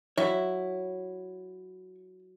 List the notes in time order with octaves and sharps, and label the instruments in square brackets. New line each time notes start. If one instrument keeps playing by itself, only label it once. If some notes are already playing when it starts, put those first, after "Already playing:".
[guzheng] F#3 [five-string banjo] E4 [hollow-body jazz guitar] C#5